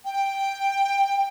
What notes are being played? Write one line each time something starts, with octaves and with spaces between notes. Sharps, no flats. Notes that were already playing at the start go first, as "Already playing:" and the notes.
G5